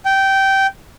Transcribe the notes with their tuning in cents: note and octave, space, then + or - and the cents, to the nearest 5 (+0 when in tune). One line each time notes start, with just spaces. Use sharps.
G5 -15